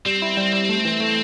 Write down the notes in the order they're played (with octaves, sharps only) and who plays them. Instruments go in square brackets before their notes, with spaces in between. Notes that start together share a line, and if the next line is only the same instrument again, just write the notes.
[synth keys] G3 [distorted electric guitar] C4
[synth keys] E4
G3
G3
A3
E3
A3